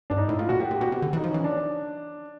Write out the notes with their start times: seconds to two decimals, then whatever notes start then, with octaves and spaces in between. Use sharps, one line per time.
0.10 G2 D4
0.17 G#2 D#4
0.28 A2 E4
0.39 A2 F4
0.49 A#2 F#4
0.59 A#2 G4
0.71 A#2
0.75 G4
0.81 B2 F#4
0.92 C3
1.02 D3
1.13 E3
1.16 D#4
1.24 F3
1.30 E3 C#4
1.44 D4